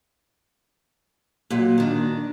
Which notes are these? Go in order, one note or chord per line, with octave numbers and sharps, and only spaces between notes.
A#2 F#3
D#3 D4